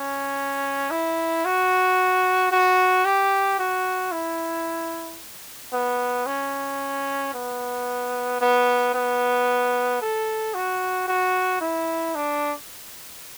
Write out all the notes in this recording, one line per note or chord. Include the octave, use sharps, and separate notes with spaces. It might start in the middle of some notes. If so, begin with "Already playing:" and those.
Already playing: C#4
E4
F#4
F#4
G4
F#4
E4
B3
C#4
B3
B3
B3
A4
F#4
F#4
E4
D4